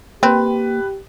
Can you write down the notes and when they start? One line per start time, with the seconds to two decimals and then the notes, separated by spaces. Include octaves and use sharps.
0.23 A#3 C4 G4 B4